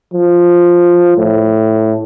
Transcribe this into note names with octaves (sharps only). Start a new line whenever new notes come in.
F3
A2